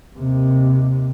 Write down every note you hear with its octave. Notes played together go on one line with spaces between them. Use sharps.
D#2 C3